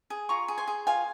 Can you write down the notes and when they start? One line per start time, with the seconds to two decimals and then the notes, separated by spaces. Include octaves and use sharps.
0.10 G#4
0.29 F4 A#5 C#6
0.48 G#4
0.58 G#5 C6
0.68 G#4
0.87 F4 F5 G#5